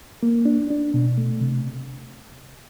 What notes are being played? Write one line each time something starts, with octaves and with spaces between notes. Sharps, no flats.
A#3
D4
D4
B2
A3
C3